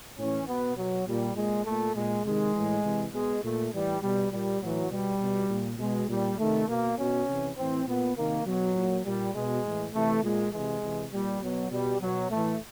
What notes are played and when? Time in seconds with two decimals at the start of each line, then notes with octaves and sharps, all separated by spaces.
0.17 A2 E3 C#4
0.47 B2 B3
0.76 B2 F#3
1.06 A#2 G3
1.35 A#2 G#3
1.65 A#2 A3
1.95 A#2 G#3
2.25 C3 D#3 G#3
2.54 A2 E3
2.83 C3 E3
3.13 B2 G#3
3.42 A#2 A3
3.72 A2 E3 G3
4.01 B2 G3
4.31 A#2 G3
4.61 A2 E3 F#3
4.90 B2 G3
5.20 B2
5.50 A#2
5.79 B2 G#3
6.09 A#2 G3
6.38 C3 D#3 A3
6.68 B2 A#3
6.98 B2 C#4
7.27 C3 E3
7.57 A2 E3 C4
7.87 A#2 B3
8.16 C3 D#3 A#3
8.46 B2 F#3
8.75 A#2
9.05 A#2 G3
9.35 B2 G#3
9.64 A2 E3
9.94 C3 E3 A3
10.23 A#2 G#3
10.53 C3 E3 G#3
10.83 C3 E3
11.12 A#2 G3
11.41 B2 F#3
11.71 B2 G3
12.00 B2 F#3
12.31 A2 E3 A3